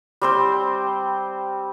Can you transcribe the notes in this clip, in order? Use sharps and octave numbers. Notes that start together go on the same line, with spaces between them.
G3 C4 C5